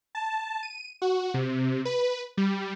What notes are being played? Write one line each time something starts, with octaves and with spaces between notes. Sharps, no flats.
A5
D#7
F#4
C3
B4
G3